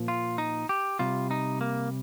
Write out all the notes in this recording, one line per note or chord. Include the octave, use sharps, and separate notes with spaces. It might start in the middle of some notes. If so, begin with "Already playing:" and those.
Already playing: A#2 F3
F4
D#4
G4
C3 G3 F4
D#4
A#3